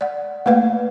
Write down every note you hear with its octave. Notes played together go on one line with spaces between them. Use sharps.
D5 F#5
A3 A#3 B4 F5